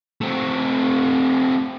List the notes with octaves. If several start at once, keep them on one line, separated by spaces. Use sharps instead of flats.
A3 C4